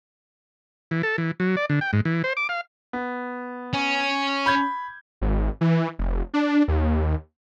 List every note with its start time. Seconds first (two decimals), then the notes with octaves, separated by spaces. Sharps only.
0.91 E3
1.03 A4
1.18 E3
1.40 F#3
1.57 D5
1.69 D3
1.81 G5
1.93 G#2
2.05 E3
2.24 C5
2.37 D6
2.49 F5
2.93 B3
3.73 C#4
4.46 B5 G6 G#6
5.21 G#1
5.61 E3
5.99 F1
6.34 D4
6.68 D#2